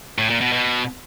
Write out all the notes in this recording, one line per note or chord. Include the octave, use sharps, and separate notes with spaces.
A2
A#2
B2
B2